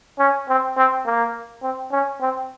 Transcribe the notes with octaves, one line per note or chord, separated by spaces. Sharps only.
C#4
C4
C4
A#3
C4
C#4
C4